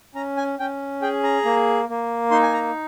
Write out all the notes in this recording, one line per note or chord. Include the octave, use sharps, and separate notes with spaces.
C#4 A#5
G#5
C#4 G5
G#4 G5
A#5
A#3
A#3
D#4 C6
G#5
A#5